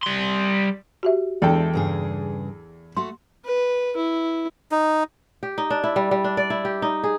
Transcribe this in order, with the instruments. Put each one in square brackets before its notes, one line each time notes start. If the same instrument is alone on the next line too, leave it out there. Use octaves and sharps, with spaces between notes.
[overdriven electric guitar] G3 C6
[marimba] F#4 G4 E5
[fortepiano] E2 A4 G5 [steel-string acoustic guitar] G#3 A3 D4
[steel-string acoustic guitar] G2 C#3 G#4
[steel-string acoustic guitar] A3 F#4 [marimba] C6
[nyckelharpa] B4
E4
[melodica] D#4
[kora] G4
D#4
D4
E4
G3
G3
D4
D5
E4
G4
D#4
G#4